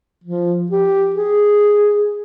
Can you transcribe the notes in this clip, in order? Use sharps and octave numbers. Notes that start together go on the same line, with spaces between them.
F3
G4
G#4